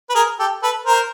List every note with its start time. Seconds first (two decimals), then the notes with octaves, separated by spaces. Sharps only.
0.10 B4
0.15 G#4 A#4
0.39 G4 A4
0.63 A4 B4
0.86 A#4 C5